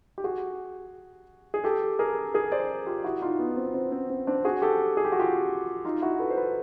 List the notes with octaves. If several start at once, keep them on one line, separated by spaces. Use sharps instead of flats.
G4
F#4 G#4
G#4
G4 A4
G#4 A#4
G#4 A#4
C5 D5
F4 G4
E4 F#4
D#4 F4
B3
C4
C4
C4
C4
C4 D4
F#4 G#4
G4 A4
G#4
G4
F#4
F4 G4
D#4 F4
E4 F#4
A4 B4
C5
A4 B4